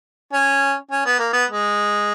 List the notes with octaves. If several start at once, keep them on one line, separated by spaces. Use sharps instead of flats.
C#4
C#4
B3
A#3
B3
G#3